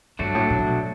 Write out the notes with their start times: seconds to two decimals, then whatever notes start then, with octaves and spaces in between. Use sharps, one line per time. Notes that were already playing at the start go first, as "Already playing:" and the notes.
0.19 G2 F#3 A3 D4 F#4
0.35 A2
0.50 A#2
0.59 C3
0.66 B2